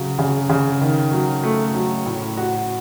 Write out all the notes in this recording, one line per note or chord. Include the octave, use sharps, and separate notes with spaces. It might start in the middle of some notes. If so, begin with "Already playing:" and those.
Already playing: C#3 F#3
C#3
C#3
D#3
F#3
A3
F#3
A2
F#4